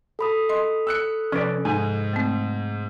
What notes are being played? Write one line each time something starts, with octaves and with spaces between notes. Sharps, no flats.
A4 B5 D#6
D#5 C6
E6 F#6 C#7
C3 F3 C#4 B4 D5
G#2 G#5
A3 C4